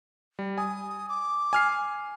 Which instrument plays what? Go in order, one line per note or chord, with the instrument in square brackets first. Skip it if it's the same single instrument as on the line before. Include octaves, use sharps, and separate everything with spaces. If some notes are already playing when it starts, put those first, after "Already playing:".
[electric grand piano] G3
[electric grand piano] G#5 [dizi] D#6
[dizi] D6
[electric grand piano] G#5 F6 C7